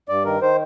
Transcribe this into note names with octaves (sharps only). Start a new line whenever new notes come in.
G2 D5
D#3 A#4
D#3 C5